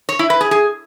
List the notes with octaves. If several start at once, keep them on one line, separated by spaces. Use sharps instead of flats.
C#5
E4
B4
G#4
G#4